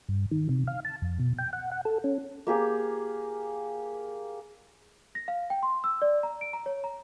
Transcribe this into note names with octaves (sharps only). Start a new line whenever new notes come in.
G2
D#3
C3
F5
A5
F2
B2
G5
F#5
F#5
A4
C#4
A#3 G4 G#4
A#6
F5
G5
C6
E6
D5
A#5
D7
A#5
C#5
A#5